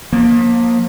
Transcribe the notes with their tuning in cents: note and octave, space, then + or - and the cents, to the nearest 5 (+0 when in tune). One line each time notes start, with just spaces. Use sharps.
F3 +40 A#3 +15